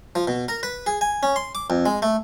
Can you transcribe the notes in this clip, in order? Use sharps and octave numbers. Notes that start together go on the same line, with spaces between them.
F3
B2
A#4
B4
G#4
G#5
C#4
C6
D6
F2
G#3
A3